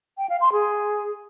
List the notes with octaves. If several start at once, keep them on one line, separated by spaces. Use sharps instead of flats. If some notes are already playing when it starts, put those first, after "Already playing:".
G5
F5
C6
G#4